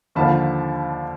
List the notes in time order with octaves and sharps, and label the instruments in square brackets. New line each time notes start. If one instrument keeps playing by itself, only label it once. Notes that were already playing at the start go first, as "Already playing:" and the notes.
[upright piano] D#2 D3 F3 A#3 A5 B5